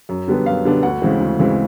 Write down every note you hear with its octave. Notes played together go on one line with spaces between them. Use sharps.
F#2
D3 G3 B3 D4
F#2 F5
D3 G3 B3 D4
D2 F#5
C#3 E3 G#3 C4
D2
C#3 E3 G#3 C4